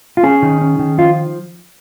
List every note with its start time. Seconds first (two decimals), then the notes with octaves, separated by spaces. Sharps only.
0.17 F4
0.23 C#4 G#4
0.42 D#3
0.61 C#4
0.79 D#3
0.98 F3 F4